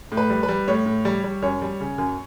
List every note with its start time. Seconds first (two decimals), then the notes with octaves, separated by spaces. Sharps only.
0.12 A2
0.17 B4
0.30 G3
0.43 B4
0.49 G3
0.68 A2 C#5
0.86 A2
1.05 G3
1.24 G3
1.42 F#2 C#5
1.62 G3
1.80 C#3
1.98 F#2